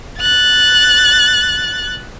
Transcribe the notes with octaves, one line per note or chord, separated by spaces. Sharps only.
F#6 A6